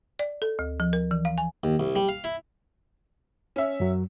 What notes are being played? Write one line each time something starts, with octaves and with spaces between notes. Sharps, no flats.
D5
A4
D2
F3
A#4
E3
F5
G#5
D#2
C2
G3
F5
E4
C#4 E5
F#2 F#3